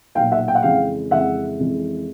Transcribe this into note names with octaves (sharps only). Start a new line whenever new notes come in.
B1 A#2 F#3 F5 G5
E5 F#5
G5
F#5
F2 C#3 E3 G#3 F5 G5
F2 C#3 E3 G#3 E5 F#5
F2 C#3 E3 G#3